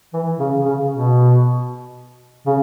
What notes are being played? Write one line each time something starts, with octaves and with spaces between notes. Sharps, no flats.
E3
C#3
C#3
B2
C#3